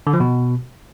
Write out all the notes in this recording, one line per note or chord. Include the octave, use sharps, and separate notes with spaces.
D3
F3
B2